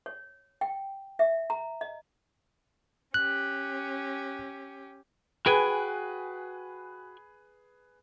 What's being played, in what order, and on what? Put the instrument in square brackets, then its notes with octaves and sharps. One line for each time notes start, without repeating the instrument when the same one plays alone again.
[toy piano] C#5
G5
E5
A#5
D#5
[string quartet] C#4 G4 [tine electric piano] F#6
[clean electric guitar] F#4 G5 G#5 [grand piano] G#4 B4